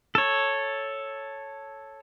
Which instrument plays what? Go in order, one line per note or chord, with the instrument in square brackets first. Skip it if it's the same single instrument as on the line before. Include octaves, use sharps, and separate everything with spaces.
[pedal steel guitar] A4 C#5